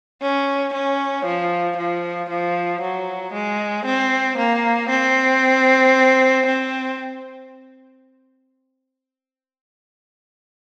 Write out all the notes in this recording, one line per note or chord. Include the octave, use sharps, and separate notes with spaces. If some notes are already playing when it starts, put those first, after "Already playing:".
C#4
C#4
F3
F3
F3
F#3
G#3
C4
A#3
C4
C4